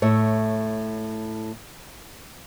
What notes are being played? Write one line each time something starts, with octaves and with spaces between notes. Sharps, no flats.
A2 C#5 E5